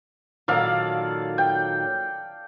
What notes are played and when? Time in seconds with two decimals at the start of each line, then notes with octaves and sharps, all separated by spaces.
0.48 A#2 D#3 F#3 A4 D5 F5
1.38 G5